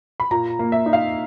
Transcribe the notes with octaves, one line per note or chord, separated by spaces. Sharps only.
B5
A#2 A#5
A#3
E5
D#4
F5